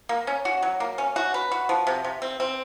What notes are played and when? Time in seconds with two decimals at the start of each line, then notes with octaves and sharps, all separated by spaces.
0.09 A#3
0.27 C#4
0.45 F#4
0.63 F#3
0.80 A#3
0.98 C#4
1.16 F#4
1.34 B4
1.51 F#4
1.69 F3
1.87 C3
2.05 C3
2.22 C4
2.40 C4